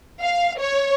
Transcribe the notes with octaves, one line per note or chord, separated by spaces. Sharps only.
F5
C#5